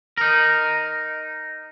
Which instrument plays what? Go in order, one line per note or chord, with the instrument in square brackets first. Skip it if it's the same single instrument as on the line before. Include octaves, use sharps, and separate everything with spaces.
[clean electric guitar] D#4 A#4